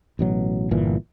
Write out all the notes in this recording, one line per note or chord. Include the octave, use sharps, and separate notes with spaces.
A1 B2 F#3
G1 A#2 E3